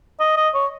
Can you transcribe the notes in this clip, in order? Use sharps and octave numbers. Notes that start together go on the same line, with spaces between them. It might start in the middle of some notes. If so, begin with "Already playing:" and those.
D#5
D#5
C#5